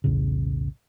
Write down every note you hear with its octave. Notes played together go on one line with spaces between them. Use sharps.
B1 E2 A2 C#3